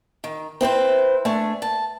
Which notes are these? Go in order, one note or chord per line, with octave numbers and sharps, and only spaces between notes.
D#3
C4 E4 B4 C5
A3 D4 G#5
A5